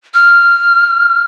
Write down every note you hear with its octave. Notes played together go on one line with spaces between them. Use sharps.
F6